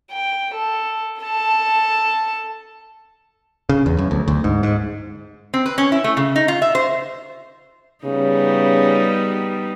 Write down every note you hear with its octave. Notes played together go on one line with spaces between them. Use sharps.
G5
A4
A4 A5
C#3
E2
F#2
D2
D2
G#2
G#2
C4
B4
C#4
E4
A3
C#3
D#4
F4
E5
C5
C#3 G3 B3 D#4